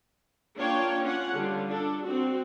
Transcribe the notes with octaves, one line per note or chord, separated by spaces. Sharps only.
A#3 D4 F4 C#5 G5
C#4 F4 C#5 F#5
D3 G3 F4
D4 A4
C4 F#4